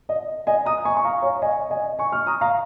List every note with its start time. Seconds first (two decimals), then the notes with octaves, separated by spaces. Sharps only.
0.09 D#5
0.47 D#5 G#5
0.66 A#5 D#6
0.85 G#5 C#6
0.97 C#6
1.04 F5 A#5
1.22 C#5 F5
1.42 D#5 G#5
1.70 D#5 G#5
1.99 G#5 C#6
2.12 C#6 F6
2.27 A#5 D#6
2.41 F5 A#5